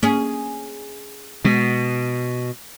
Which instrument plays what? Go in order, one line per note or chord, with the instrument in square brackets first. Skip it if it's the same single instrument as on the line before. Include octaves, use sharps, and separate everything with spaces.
[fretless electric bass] A#3 [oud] C#4 G#4
[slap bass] B2 [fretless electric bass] G#3